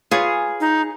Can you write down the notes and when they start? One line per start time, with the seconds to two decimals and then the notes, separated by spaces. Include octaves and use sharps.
0.11 F4 G#4 B4 C#5
0.60 D#4